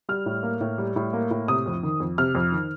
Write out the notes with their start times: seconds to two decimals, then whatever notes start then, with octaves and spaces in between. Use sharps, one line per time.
0.09 G3 F6
0.26 A2
0.43 A#3
0.61 A2
0.78 G3
0.96 A2
1.13 A#3
1.31 A2
1.48 C3 D#6
1.66 F2
1.83 D#3
2.00 F2
2.18 C3 F6
2.35 F2
2.52 D#3